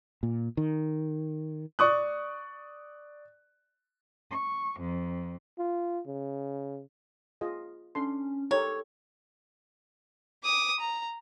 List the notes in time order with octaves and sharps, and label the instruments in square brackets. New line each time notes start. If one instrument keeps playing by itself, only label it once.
[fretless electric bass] A#2
D#3
[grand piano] D5 C#6 D#6 F#6
[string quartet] C#6
F2
[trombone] F4
C#3
[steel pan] F4 G#4 D#5
[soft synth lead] C#4 [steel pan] D4 A4 C6
[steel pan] D#4 G4 A#4 [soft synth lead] A4 [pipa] C#5
[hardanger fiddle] D6 D#6
A#5